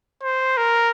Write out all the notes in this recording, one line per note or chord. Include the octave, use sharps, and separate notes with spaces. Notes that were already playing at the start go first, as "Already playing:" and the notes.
C5
A#4